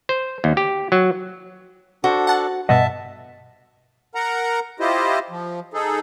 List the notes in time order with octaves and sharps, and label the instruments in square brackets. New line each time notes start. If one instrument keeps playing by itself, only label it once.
[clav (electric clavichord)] C5
D#2
G4
F#3
[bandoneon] D4 A4 [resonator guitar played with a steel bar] F#4 C5
[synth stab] F#5 A5
[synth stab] G2 B2 [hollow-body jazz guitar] D#5 F#5 [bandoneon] E5 A5
[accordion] A#4 F#5 A#5
E4 F4 G4 C5 D#5
F3
D#4 G#4 A4